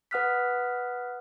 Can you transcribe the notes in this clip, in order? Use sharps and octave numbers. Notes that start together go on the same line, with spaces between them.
B4 F#5 D#6 F6 F#6 B6